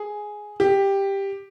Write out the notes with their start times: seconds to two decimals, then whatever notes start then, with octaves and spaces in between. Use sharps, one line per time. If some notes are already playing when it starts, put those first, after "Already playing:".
Already playing: G#4
0.60 G4